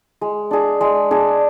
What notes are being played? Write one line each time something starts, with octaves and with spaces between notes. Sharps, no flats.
G#3
D4 G#4
G#3
D4 G#4